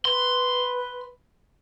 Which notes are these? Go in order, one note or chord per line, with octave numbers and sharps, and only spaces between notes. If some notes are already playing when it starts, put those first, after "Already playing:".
B4 C6